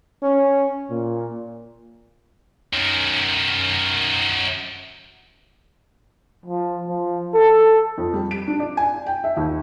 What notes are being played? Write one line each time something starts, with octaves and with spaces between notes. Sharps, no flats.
C#4
A#2
F#2 D#3
F3
F3
A4
F2
G3
D7
D4
D5
G#5
G5
E5
D#2